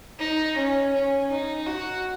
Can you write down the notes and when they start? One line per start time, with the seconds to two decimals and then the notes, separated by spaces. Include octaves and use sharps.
0.20 D#4
0.57 C#4
0.93 C#4
1.30 D#4
1.66 F#4